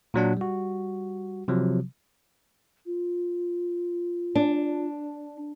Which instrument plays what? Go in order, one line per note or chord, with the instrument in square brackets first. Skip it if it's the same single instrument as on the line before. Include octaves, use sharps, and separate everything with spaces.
[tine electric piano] A#2 F#3 D4 F#5
G3 F#4
C3 F3 F#3
[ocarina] F4
[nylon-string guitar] D4